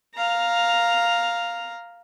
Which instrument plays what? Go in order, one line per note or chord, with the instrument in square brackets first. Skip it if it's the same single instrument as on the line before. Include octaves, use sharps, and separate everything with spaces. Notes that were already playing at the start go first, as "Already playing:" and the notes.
[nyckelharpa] F5 A#5